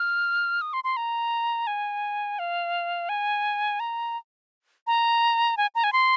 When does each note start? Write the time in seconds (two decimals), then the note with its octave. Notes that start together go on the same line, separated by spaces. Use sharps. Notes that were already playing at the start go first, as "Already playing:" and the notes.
Already playing: F6
0.61 D#6
0.73 C6
0.84 C6
0.97 A#5
1.67 G#5
2.39 F5
3.09 G#5
3.80 A#5
4.87 A#5
5.57 G#5
5.75 A#5
5.84 G#5
5.93 C6